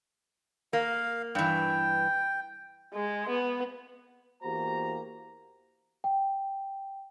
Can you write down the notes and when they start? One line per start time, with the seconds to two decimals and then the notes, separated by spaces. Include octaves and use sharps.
0.73 A#3 F5
1.35 G2 E3 G5
2.94 G#3
3.29 B3
4.43 E2 A#3 F#4 G4 C5 A#5
6.04 G5